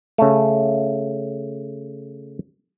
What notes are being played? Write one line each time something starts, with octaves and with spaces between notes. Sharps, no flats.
C#3 A3